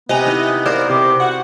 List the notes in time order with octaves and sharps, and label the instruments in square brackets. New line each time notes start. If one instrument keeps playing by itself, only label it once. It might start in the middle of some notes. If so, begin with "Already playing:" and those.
[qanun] C3 A#5 [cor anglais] B3 [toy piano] C5 G5 G#5 [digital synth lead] D#5
[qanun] D#4 E4
[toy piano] G#4 D5 F5 [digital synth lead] A#4 [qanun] C5
[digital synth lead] C3 [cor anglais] G4
[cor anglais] F#4 [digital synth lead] F#5